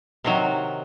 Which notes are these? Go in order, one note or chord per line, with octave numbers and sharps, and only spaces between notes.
C3 D#3 F#3